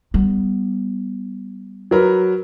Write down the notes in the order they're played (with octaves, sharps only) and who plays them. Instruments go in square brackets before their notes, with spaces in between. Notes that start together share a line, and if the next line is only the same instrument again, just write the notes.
[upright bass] G3 B3
[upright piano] F#3 A#4 B4